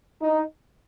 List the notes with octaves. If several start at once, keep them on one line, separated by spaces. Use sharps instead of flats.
D#4